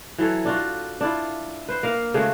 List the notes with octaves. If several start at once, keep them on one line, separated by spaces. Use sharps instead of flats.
E3 F#3 A4
D4 F4 F#4
D4 E4 F4
B4 C5
A#3 A#4 F5
C#3 G#3 A3 F#4